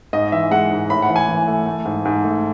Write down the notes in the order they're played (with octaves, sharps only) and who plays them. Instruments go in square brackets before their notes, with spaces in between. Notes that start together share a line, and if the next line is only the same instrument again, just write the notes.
[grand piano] G#2 D#5
E3 E5
G#3 F#5
G#2
A2 B5
F#5
E3
G#5
E3
A3
A3
G#2
G#2
A3